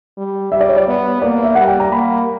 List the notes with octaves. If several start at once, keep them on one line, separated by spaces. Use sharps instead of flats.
G3
G3 E5
D5
C#5
D5
B3
A#3 D5
E5
G3 F#5
G5
A#5
A#3 B5